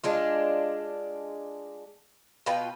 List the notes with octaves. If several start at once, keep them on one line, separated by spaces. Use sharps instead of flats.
G#3 D4 F4
B2 F4 B4 G5